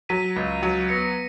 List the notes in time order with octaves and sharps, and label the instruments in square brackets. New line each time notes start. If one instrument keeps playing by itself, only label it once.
[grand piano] F#3 [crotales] B6 D#7
[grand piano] C#2
F#3
[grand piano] B3 [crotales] A#6 C#7